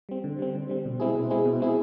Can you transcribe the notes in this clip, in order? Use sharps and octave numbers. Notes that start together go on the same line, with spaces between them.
G3 C4
D3
G3 C4
D3
G3 C4
B2
G#3 C4 E4 G#4
B2
G#3 C4 E4 G#4
B2
G#3 C4 E4 G#4